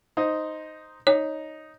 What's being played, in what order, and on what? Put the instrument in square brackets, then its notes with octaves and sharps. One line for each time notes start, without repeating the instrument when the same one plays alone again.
[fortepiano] D#4 C5 D#5
[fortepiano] D#4 [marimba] C#5